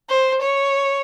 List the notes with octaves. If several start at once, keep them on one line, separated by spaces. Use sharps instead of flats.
C5
C#5